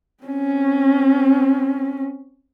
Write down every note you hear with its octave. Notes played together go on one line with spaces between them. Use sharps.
C4 C#4